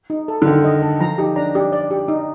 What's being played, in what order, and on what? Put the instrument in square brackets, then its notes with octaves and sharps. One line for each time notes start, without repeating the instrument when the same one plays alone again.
[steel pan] D#4
A4
[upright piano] D3
[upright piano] D#3 [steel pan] F4
[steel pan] D#5
A4
[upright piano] F3 [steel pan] A#5
[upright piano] D#4 [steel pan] G4
[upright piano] D4 [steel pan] A#5
[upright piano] D4 [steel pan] G4
[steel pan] D5
G4
D#4